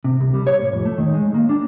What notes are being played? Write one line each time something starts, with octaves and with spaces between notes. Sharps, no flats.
C3
C2
G3
C#5
A2
F2
A3
D#3
G#3
A#3
D4